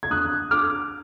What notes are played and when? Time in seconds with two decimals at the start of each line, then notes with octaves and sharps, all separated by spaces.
0.03 G#6
0.11 D4 D#6 F#6
0.51 D4 D6 F6